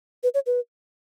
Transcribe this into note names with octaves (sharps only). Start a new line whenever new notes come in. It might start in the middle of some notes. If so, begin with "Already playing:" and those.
B4
C#5
B4